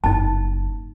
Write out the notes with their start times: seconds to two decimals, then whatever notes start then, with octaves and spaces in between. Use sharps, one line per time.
0.04 F#1 D#4 A5